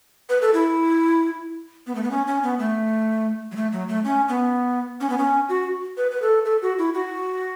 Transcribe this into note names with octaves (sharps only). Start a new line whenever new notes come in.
B4
A4
E4
B3
A3
B3
C#4
C#4
B3
A3
F#3
A3
F#3
A3
C#4
B3
C#4
B3
C#4
F#4
B4
B4
A4
A4
F#4
E4
F#4